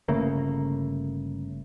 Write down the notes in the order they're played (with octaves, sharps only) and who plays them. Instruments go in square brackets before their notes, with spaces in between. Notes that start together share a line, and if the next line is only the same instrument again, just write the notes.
[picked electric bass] G1 C#3 A3 A#3